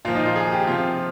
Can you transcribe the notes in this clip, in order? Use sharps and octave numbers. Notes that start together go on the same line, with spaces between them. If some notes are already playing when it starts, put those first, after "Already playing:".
A#2 F3 F4
D#4
F4
G#4
G4
C3 F3 F4